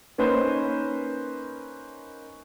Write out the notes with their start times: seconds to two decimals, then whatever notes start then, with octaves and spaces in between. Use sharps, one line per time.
0.18 A#3 C#4 D#4 B4 C5